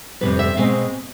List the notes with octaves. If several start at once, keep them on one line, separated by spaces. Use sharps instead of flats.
F2 C3 D#3 G3 B4
E5
B2 G#3 C4 F5